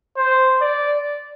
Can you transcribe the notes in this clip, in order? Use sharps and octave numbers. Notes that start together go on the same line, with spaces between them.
C5
D5